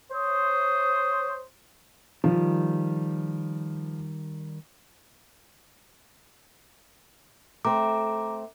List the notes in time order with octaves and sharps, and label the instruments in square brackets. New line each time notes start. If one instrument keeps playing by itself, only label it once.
[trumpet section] C5 C#5 D#6
[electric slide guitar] D#3 G3 [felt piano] F3
[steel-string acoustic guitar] A3 C4 [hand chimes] A#5 D6